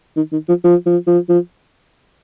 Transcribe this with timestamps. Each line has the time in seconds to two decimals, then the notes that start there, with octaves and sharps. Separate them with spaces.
0.16 D#3
0.32 D#3
0.48 F3
0.64 F3
0.86 F3
1.07 F3
1.29 F3